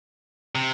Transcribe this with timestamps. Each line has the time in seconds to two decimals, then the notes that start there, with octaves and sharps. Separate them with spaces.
0.55 C3